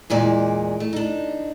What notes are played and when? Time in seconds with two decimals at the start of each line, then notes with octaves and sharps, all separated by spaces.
0.10 E2 A#2 G#3 D5
0.80 A3
0.93 D4 D#4